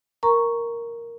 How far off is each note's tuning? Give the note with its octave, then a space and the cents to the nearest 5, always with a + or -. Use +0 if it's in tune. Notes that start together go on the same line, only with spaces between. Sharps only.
A#4 +0 A#5 +0 C#6 +0